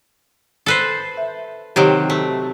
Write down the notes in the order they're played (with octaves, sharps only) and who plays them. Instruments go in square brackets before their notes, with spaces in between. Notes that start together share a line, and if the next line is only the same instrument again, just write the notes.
[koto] A4 B4 C5
[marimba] E5
[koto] C3 D#3 F#3 [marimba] G4
[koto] A3